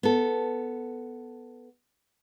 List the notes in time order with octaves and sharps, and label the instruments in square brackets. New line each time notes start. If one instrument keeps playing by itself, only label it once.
[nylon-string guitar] B3 A4